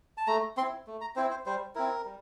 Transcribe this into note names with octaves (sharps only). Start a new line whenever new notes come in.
A5
A3 A#5
C4 E4 C6
A3
A#5
C4 E4 C5
C5
G3 C5
C4 E4 A#4
G3